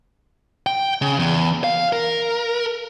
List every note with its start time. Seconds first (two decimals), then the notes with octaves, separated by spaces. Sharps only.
0.67 G5
1.02 C#3
1.19 E2
1.64 F5
1.93 A#4